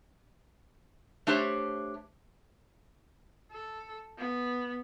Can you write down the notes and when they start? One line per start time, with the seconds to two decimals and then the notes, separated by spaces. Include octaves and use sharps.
1.27 A3 D4 G4 C5 C#5
3.52 A4
4.18 B3